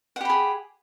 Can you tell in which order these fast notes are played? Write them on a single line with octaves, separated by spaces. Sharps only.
F#5 G4 B5 G#4